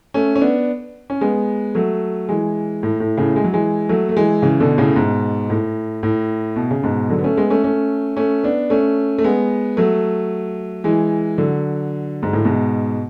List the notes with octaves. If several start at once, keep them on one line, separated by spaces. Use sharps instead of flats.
A3 C#4
C#4
B3 D4
C#4
G#3 B3
F#3 A3
E3 G#3
A2
A2
A2 C#3
G#3
F#3
E3 G#3
F#3 A3
A3
E3 G#3
C#3 E3
B2 D3
A2 C#3
G#2 B2
A2
A2
B2
C#3
G#2 B2
D3 F#3
B3
A3 C#4
G#3 B3
A3 C#4
A3 C#4
A3 C#4
B3 D4
A3 C#4
A3
G#3 B3
F#3 A3
E3 G#3
D3 F#3
G#2
A2
G#2 B2